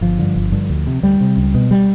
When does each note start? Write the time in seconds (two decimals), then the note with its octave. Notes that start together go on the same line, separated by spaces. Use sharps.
0.01 G1 F3
0.19 G2 D3
0.36 G1
0.52 G2 D3
0.70 D2
0.87 C3
1.03 D2 G3
1.21 C3
1.37 C#2
1.54 B2
1.71 G3